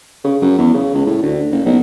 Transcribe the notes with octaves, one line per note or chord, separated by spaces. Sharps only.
C#3
F#2
E2
C#3
C#2
A2
D2
F#1
B1